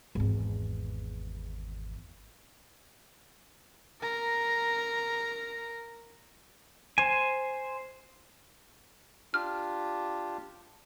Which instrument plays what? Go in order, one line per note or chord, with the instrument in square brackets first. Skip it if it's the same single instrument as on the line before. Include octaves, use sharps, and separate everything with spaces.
[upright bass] G#1 E2
[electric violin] A#4 A#5
[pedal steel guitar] C5 G#5
[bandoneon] D4 F4 G4 [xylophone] F6